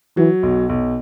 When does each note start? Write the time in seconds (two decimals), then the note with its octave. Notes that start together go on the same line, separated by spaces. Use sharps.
0.17 E3 F#3
0.43 B1
0.69 B1